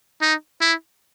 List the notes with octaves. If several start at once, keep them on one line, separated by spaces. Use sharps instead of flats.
D#4
E4